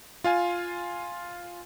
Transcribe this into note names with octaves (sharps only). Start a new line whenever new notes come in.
F4 F5 G#5